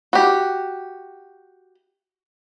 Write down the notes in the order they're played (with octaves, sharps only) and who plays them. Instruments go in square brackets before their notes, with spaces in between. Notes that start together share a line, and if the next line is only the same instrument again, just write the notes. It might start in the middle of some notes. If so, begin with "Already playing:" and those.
[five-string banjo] F#4 G4